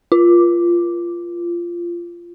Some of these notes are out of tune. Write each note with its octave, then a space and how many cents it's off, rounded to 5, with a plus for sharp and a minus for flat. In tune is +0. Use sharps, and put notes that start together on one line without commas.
F4 -15